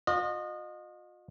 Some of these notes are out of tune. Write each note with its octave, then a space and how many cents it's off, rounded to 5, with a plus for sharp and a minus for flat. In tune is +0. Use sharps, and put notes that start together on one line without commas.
F4 +45 D#5 -25